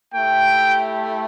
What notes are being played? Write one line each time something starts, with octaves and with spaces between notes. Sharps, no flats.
A3 E4 G4 G5